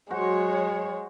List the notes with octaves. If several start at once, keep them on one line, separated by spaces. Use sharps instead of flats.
F#3 G#3 F#4 C5 C#5